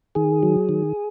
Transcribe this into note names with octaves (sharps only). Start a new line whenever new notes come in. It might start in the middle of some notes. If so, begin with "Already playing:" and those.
D#3 G#4
F#3
D#3